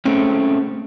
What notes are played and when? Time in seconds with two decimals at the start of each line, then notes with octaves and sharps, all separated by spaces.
0.05 G#3 A3 C4 C#4